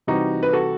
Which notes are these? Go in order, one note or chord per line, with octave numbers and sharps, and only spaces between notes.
C3 E3 G3 D#4 F#4
B4
F#4 A4